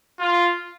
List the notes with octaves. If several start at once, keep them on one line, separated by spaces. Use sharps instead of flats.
F4